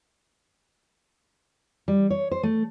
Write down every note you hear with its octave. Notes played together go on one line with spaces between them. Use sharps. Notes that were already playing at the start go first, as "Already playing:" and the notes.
G3
C#5
C5
A3